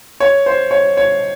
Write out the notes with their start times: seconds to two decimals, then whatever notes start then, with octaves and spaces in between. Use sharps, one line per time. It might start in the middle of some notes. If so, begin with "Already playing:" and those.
0.20 C#5
0.46 C5
0.71 C#5
0.97 C#5